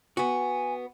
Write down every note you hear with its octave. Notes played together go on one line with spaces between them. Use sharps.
B3 F#4 G#5